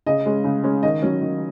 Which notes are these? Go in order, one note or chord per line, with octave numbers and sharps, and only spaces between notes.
C#3 D#5
G#3 C#4
C#3
G#3 C#4
D#3 D#5
F#3 C#4
D#3